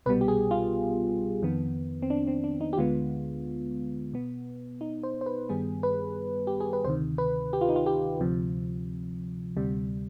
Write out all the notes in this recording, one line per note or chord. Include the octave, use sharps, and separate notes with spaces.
C2 B2 G3 B3 B4
G4
G#4
F4
F2 D#3 B3
C4
D4
C4
D4
D#4
G4
D2 D3 G#3 B3 F4
B2 B3
D#4
C5
C5
B4
G2 D#3 G3 B3 G#4
B4
G4
G#4
B4
D2 C3 D#3 C5
B4
G4
F4
D#4
F4
G4
D2 C3 F3
D2 C3 G3